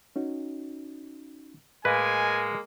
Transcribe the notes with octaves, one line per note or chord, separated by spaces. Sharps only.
C#4 D#4 F#4
A2 G#3 A#3 B4 D#5 F5 G#5